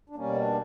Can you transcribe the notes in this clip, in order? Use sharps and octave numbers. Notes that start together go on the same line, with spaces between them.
D4
B2 G3 A#3 C#4
D4